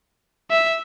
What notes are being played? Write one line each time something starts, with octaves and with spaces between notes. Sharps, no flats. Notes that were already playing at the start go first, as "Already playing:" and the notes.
E5